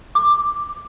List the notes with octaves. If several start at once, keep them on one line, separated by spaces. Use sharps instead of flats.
D6